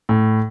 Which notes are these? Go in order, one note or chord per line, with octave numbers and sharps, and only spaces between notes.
A2